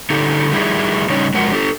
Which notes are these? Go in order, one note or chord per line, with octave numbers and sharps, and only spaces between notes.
D3 D#4 G4 A4
D#3 G3 E4 G#4
C#3 G3 C#4 D#4 C#5
F2 F#3 G#3 A#4 F#5
D4 G4 A4